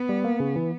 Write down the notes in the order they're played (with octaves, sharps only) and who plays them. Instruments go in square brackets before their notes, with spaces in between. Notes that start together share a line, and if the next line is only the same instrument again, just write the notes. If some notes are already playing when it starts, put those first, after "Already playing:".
Already playing: [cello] B3
[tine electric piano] G3
A#3
C#3
E3